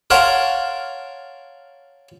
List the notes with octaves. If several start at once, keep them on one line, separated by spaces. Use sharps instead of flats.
A#4 C#5 F5 F#5 A5 C6